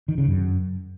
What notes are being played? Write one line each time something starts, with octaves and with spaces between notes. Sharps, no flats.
D#3
C#3
F#2